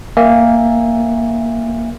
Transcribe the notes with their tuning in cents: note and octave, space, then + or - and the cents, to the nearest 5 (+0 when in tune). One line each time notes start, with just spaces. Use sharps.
A#3 +0 E5 +0 G#5 -25